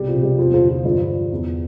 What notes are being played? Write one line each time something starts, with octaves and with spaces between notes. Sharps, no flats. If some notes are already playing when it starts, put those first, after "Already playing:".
Already playing: C2 B2 G3
F3
C3
G3
E2 F3
F3
D3
F3
G2 F3
F3
E2